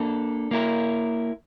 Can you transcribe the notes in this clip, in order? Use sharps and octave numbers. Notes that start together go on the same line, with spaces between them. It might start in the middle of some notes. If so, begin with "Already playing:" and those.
Already playing: A#3 D4 A4
A#3 E4 A#4